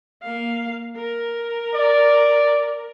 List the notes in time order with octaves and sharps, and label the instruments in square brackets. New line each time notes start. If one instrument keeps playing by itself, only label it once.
[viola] A#3 F5
A#4
[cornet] D5